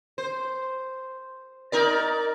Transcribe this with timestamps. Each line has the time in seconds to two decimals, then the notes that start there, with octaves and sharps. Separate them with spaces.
0.18 C5
1.72 D#4 A#4 D5